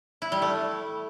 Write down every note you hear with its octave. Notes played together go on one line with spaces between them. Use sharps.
E4
G3
A3